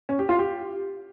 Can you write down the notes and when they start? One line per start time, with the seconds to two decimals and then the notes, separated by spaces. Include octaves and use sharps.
0.09 C#4
0.19 G4
0.29 F4
0.39 G4